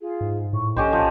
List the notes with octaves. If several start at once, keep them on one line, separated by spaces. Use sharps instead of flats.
F4 G#4
G#2
A2 C#6
A#1 C#4 G4 A4 C5 D#5
F3